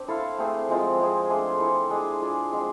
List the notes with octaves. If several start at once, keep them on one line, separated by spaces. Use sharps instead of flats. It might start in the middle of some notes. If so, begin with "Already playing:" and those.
Already playing: C4 D4
E4 A4 C5 F5
A3 C4 G#4
F3 G#3 C4 F4
G#3 C4 G#4
A3 D4 G#4 C5
E4 A4 C5
G#3 D4 G#4
D4 F4 G#4 D5
F3 G#3 C4 G#4